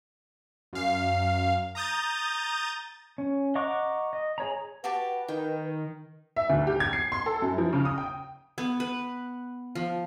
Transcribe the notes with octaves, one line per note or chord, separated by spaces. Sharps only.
F#2 F5
A#5 D#6 G6 A6
C#4
D#5 F#5 A#5 C#6 D6
D#5
G#4 C#5 A#5
F#4 G4 B4 A5
D#3 G5
E5
D2
G4
G#6
C7
C6
A4
F#2
F3
C#3
D#6
G5
B3
B4
F3